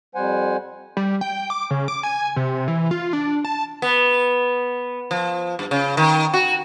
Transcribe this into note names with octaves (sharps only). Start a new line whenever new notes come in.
F2 G3 C5 F#5 G#5
G3
G5
D6
C#3
D6
G#5
C3
E3
F4
D4
A5
B3
F3
G2
C#3
D#3
F#4